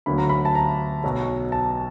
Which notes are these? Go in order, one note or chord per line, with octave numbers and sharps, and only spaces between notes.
D2 D3 F#3 A#3 B5
A#5
B5
A5
A#5
B1 B2 F#3
A5